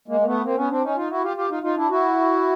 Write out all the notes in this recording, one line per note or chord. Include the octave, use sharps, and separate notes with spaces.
G#3 A#3
A#3
A3 B3
A#3 C4
B3 C#4
C4 D4
C#4 D#4
D#4 F4
E4 F#4
F4 G4
F4 G4
D#4 F4
D#4 F4
D4 E4
E4 F#4